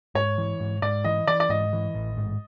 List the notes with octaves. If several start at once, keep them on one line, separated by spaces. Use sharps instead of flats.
G#2 C#5
E3
G#2
G#2 D5
E3 D#5
E3 D5
D5
G#2 D#5
E3
A1
G#2